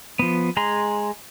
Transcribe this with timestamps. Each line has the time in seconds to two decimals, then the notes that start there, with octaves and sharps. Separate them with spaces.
0.19 F3 B3
0.57 G#3 G#4 A#5 C6